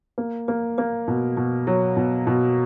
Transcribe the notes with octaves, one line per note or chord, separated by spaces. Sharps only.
A#3
A#3
A#3
B2
B2
F#3
B2
B2